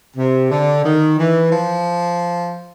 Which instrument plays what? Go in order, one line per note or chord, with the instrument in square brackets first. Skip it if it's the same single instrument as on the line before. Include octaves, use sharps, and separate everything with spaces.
[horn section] C3
D3
D#3
E3
F3